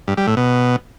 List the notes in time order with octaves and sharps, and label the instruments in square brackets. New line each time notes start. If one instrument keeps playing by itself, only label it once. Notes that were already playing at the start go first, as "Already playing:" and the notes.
[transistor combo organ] G2
G3
A2
B2